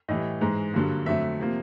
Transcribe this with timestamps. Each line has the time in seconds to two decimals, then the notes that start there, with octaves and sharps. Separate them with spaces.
0.08 A2 E3 G3 D#5
0.41 G#2 E3 G#3
0.74 G2 D3 F#3 A#3
1.06 F2 D3 F#3 A3 E5
1.39 C3 F3 A#3